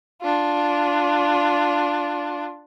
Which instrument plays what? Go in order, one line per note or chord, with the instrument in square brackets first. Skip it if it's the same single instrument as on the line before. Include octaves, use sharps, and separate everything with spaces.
[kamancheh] D4 F4